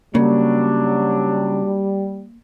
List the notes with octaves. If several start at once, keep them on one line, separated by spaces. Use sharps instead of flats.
C#3 F#3 G3 A#3 D4